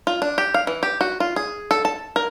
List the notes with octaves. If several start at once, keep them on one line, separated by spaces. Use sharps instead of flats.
F4
D4
G4
F5
E3
G4
F#4
F4
G#4
A4
A5
A#4